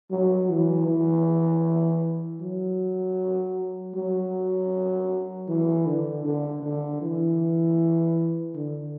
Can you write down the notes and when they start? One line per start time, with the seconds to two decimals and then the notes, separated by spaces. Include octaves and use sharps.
0.11 F#3
0.49 E3
0.88 E3
2.40 F#3
3.95 F#3
5.48 E3
5.86 D3
6.25 D3
6.62 D3
7.01 E3
8.55 D3